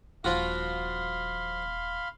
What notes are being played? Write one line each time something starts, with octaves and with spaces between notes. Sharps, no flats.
D#1 F3 F4 F#4 F5 B5 C6